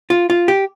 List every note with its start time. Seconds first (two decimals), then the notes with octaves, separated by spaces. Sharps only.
0.10 F4
0.30 F4
0.48 G4